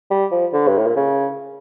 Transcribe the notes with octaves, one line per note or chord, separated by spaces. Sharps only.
G3
F3
D3
G2
A2
A#2
C#3